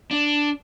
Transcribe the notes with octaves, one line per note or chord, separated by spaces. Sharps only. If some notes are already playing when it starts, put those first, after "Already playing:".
D4